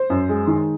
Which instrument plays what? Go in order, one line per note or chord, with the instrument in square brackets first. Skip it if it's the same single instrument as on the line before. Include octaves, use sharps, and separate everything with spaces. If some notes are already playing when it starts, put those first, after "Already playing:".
Already playing: [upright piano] C5
F#2
G#3
D#3